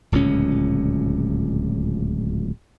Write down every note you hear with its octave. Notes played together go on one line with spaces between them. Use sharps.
D1 C#2 A#2 C#4